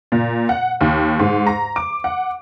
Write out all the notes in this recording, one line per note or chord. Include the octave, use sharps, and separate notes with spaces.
A#2
F#5
D#2
G#2
A#5
D6
F#5